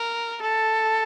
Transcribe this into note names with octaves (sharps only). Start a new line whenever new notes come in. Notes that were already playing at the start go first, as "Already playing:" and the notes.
Already playing: A#4
A4